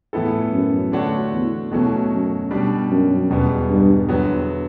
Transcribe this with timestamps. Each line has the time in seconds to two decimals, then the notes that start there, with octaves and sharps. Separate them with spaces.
0.13 A2 E3 B3 E4 A4
0.52 F#2
0.92 D3 A3 D4 F#4 C#5
1.32 E2
1.71 E2 B2 F#3 A3 C#4
2.11 F#2
2.51 B2 G3 D4
2.90 F#2
3.30 E1 E2 B2 G3 B3
3.69 G2
4.09 E2 D3 F#3 B3